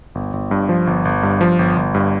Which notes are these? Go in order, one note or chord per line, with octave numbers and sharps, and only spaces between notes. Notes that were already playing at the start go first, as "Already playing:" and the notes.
G1
G1
G2
F3
G1
G1
G2
F3
G1
G1
G2